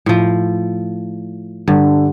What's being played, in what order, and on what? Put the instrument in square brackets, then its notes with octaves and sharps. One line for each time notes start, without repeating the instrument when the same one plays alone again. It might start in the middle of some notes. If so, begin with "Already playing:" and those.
[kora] A2 F3
[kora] G2 [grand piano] D3